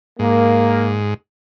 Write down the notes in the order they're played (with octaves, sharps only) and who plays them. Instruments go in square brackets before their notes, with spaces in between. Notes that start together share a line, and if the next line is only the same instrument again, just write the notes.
[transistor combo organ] G#2 [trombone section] A#3